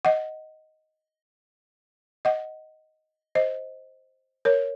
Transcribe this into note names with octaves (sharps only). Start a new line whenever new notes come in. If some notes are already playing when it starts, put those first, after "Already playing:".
D#5 F#5
D#5 F#5
C5 D#5
A#4 C#5